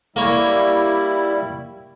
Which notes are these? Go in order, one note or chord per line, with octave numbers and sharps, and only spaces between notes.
G3 A#3 E4 C#5